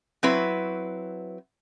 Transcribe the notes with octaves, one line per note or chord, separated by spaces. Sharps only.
F#3 C4 E4 B4